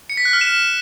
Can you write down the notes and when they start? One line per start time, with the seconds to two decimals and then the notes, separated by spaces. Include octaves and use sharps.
0.10 C#7
0.17 B6
0.25 F#6
0.33 F6
0.41 E7